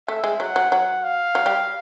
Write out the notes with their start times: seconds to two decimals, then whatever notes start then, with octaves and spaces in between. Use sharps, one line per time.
0.08 A3 E5
0.24 G#3
0.40 F#3 F#5
0.56 F#3
0.72 F#3 F#5
1.04 F5
1.35 F#3
1.46 G3